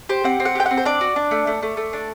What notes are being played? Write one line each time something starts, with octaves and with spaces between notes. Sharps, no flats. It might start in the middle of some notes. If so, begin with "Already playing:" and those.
G4 C5
C4 F#5
C4
F#5
G4 G5
C4 F#5
C5
D4 D5
F#4
D4
A3
A3
A3
A3
D4